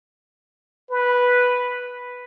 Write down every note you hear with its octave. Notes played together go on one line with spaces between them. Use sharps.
B4